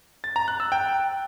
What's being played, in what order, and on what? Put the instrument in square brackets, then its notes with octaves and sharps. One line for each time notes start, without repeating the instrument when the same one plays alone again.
[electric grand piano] A6
A#5
F#6
E6
G5